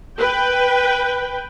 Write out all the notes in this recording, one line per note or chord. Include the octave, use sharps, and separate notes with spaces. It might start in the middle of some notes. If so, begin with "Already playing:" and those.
B4 G5